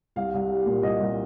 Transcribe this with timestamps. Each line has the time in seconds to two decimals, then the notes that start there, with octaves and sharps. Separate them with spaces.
0.16 C2 F5
0.34 C2
0.49 G3
0.66 A#2
0.83 C2 D#5
1.00 C2